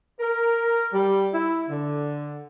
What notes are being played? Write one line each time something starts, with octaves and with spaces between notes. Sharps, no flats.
A#4
G3
E4
D3